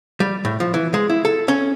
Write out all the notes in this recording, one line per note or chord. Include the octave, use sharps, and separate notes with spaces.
G3
A2
F3
E3
G#3
E4
A4
C#4